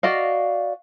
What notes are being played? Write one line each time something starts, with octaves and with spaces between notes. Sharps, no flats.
F#4 D5 D#5 F5